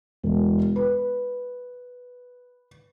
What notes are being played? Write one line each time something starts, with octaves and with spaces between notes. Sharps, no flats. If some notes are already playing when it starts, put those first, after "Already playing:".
E1
B4